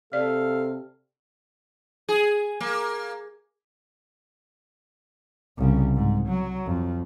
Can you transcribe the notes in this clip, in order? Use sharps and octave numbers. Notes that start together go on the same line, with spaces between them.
C3 A4 D5 F5
G#4
A#3
C2 C#3
G#2
F#3
F2